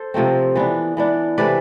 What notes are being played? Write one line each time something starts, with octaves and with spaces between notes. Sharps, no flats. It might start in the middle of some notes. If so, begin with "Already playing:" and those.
Already playing: A4 C5
C3 F3 A3 C4
E3 B3 D4
E3 B3 D4
C3 E3 A3 B4 D5